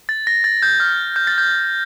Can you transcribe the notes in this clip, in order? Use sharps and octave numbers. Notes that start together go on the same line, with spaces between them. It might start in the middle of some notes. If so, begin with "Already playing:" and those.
A6
A#6
A6
G6
F6
G6
A6
G6